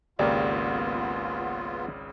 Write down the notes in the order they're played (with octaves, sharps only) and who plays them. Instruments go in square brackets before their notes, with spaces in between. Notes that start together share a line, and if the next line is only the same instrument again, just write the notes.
[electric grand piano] G#1 C#2 C#3 [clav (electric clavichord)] A#3 G4 D5 [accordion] B3 F4